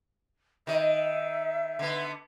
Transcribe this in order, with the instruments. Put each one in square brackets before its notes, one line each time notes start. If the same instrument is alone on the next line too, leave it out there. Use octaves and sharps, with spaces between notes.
[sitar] D#3 D#5 [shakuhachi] E5
[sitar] D3 B3